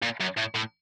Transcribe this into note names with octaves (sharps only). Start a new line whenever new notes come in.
A#2
F#2
A2
A2